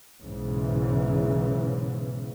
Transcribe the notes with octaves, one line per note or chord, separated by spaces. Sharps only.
B1 G#2 C#3 E3